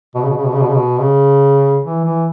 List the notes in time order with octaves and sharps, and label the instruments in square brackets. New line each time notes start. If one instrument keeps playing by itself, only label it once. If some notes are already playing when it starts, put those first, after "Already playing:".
[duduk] B2
C#3
B2
C#3
B2
C#3
B2
C#3
B2
C#3
E3
E3